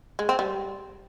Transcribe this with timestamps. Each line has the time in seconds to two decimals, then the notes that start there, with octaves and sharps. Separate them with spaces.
0.19 G#3
0.29 C4
0.39 G3